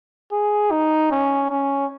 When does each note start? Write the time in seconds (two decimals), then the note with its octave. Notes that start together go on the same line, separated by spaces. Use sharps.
0.32 G#4
0.71 D#4
1.11 C#4
1.50 C#4